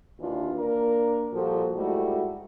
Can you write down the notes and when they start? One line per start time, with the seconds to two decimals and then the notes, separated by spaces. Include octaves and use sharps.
0.20 D#2 E3 D4 F4
0.56 A#3 D4 A#4
1.33 A#2 F3 G3 F#4 A4
1.76 G#2 G3 A3 E4 F#4